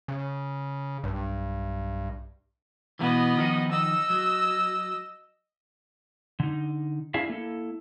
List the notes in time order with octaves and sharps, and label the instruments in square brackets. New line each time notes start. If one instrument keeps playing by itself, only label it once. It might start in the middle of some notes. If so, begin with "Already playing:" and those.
[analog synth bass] C#3
[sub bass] B1 [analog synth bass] G2
[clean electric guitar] B2 E3 [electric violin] B3 D#5
[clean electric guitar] D#3 F3 D#4
[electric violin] D#5 E6
[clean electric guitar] F#3
[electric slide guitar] D3 D#4
C4 D4 E4 G#4 E5 F5
A#3 E4 A4